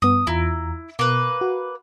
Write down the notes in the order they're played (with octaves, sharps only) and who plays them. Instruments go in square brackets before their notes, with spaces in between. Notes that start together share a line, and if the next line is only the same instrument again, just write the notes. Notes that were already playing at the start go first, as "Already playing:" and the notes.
[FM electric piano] G2 B3 [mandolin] D#6
[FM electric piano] E2 F4 A#5 [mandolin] E4
[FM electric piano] B2 [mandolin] A#3 B4
[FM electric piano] F#4